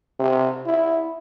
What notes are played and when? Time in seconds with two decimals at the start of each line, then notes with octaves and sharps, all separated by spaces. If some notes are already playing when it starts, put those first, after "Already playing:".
0.19 C3
0.66 E4